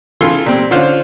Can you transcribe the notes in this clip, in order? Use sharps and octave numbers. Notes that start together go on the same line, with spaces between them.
C#3 E3 F4 A4 C6
A#2 G3 C4
D3 C#4 F4 C5